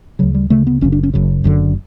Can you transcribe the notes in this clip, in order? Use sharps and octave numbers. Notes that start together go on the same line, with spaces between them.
D2 C#3 F#3
G3
D2 C#3 A3
B3
F#1 F#2 C#3 C#4
D4
C#4
F#1 F#2 C#3
F#1 F#2 D3